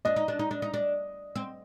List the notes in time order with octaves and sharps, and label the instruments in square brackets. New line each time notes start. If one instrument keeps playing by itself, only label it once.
[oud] D4 [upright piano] D#5
[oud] D#4
D4
D#4
D4
D#4
D4
C4